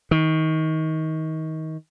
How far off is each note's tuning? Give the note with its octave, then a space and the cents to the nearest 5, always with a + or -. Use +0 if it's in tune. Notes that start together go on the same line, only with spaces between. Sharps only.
D#3 +25